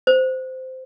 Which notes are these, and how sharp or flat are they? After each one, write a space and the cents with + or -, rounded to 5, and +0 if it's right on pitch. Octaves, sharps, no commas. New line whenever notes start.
C5 -15